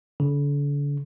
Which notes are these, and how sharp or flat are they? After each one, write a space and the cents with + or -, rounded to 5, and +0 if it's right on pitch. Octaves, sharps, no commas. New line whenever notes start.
D3 -40